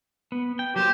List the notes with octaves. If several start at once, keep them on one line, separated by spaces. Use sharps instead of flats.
B3
G5
F#3 A#3 G4 C5